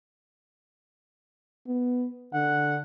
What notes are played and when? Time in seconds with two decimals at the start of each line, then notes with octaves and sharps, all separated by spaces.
1.67 B3
2.33 D3 F#5